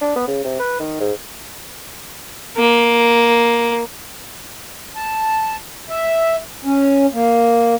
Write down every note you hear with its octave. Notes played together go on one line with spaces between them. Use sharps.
D4
B3
C#3
C3
B4
D#3
G#2
A#3
A5
E5
C#4
A#3